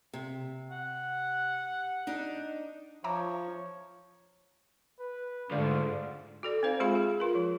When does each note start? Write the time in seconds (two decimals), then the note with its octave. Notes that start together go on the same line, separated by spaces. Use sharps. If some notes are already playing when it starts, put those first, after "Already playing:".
0.13 C3
0.71 F#5
2.07 D4 D#4
3.04 F3 C#5 E5 A#5 D6
5.00 B4
5.51 D2 G#2 D3 F4 A4 D5
6.43 F#4 A4 D5
6.63 C4 D#4 C5 F5
6.80 G#3 F4 G#4 F5 B5
6.95 G#4
7.19 F4 A#4 B4
7.35 F3